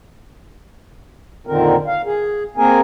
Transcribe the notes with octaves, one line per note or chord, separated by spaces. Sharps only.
F2 A#2 D3 D#3 C4 A#4
F5
G#4
A#3 C4 G#4 A#4 G#5